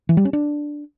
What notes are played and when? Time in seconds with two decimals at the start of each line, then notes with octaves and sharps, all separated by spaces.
0.09 E3
0.17 G3
0.25 C#4
0.33 D4